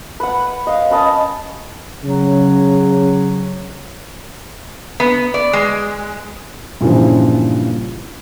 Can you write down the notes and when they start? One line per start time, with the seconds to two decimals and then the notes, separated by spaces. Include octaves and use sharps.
0.20 B4 F#5
0.67 D#5 F5
0.91 C#4 B4 D#5 A5
2.04 C#3 F#3
5.00 B3
5.34 D5
5.53 G#3
6.81 G2 A#2 C#3 E3 F3